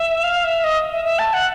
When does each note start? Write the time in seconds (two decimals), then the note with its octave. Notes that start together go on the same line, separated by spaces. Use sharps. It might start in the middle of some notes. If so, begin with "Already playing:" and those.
Already playing: E5
0.24 F5
0.44 E5
0.64 D#5
0.92 E5
1.05 E5
1.19 A5
1.33 F#5